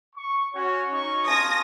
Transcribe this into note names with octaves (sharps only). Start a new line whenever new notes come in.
C#6
C#4 F#4 C#5
C#4 D#4 C#6
F4 G#5 A5 D#6 A#6